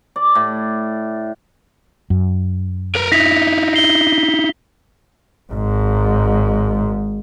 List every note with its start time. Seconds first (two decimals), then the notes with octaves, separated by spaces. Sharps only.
0.16 D5
0.35 A2
2.10 F#2
2.95 A#4 B4 A#5
3.12 D#4 E4 A#6 B6 F7
3.74 C7 G7
5.53 G#1 G#2